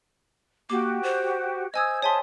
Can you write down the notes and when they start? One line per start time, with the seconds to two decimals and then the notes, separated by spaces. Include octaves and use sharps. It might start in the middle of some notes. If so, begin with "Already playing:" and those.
0.70 A#3 F#4 G4 D6
1.03 C5
1.74 C5 D#5 G#5 D#6 E6 G#6
2.02 G#4 C#5 E5 G#5 A5 C6